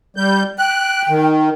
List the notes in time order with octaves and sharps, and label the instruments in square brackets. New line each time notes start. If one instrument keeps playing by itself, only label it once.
[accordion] G3 G6
[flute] G5 [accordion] F#6
[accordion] D#3